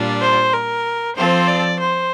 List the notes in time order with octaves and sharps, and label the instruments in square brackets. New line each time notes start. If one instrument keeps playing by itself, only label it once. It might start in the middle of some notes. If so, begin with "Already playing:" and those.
Already playing: [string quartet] A#2 G3 D4 F4
[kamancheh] C5
A#4
[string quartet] F3 C4 F4 A4 [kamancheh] C5
[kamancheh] D5
C5